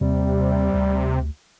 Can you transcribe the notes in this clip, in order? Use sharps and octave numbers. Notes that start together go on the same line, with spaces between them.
D#2 C3 G3
D2